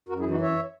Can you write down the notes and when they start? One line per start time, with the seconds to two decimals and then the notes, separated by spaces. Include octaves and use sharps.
0.09 F#2 F#4 A#4
0.20 E4 G#4
0.25 E3
0.31 D#4 F#4
0.41 F#2 C#5 E5